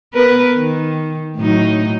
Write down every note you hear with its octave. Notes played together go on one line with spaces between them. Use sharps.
B3 A#4 B4
D#3
A2 F#3 D#4